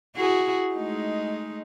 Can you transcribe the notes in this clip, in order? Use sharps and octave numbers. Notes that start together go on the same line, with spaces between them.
E4 F#4 G#4
G#3 A3 D#4